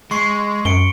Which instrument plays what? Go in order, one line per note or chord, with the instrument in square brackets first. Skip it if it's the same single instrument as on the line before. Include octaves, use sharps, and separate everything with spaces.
[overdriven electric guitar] G#3 [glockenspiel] C6 C#6 C7
[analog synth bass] F#2 [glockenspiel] C#7 D7 G7